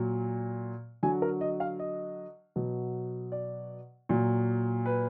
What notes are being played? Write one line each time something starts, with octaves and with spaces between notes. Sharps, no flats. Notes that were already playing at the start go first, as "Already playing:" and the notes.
Already playing: A#2 F#3
D3 F#3 G#5
A#4
D#5
F5
D#5
B2 F#3
D5
A#2 F#3
B4